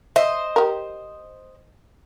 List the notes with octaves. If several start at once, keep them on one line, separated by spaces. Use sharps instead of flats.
C5 D#5 E5
G4 A#4